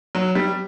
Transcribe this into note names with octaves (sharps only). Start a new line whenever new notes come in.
F#3
G3